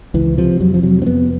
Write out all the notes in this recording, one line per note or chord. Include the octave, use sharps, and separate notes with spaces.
C#2 E3
C3 F3
F2 F#3
F3
C3 F#3
C4
F2 B3